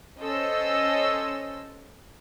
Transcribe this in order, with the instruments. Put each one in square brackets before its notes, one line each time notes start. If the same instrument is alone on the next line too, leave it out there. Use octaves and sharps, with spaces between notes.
[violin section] C#4 A4 C5 D#5 E6